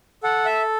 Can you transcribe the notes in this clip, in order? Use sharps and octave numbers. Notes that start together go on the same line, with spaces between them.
A4 F#5
E5